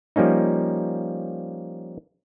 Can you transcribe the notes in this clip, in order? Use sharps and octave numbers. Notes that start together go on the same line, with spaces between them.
F3 G3 A#3 C#4 D#4